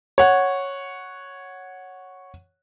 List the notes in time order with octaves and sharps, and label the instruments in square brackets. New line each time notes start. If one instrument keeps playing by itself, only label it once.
[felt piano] C#5 F#5